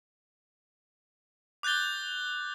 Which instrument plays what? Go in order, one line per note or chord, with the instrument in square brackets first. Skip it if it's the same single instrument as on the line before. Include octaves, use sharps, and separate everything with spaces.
[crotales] D6 F#6 G6 A6 G7